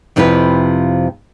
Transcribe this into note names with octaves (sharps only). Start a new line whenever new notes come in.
F2 C3 F3 E4 B4 F5